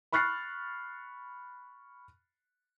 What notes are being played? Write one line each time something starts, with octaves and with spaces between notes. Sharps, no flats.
B5 C#6 F6 F#6 A6 C7